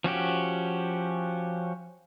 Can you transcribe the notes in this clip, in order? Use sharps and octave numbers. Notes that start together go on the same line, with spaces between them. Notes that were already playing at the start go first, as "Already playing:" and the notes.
F3 C#4 F#4 G4